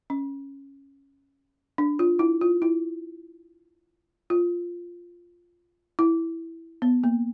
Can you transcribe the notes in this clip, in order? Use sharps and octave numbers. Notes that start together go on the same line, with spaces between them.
C#4
D4
F4
E4
F4
E4
F4
E4
B3
A#3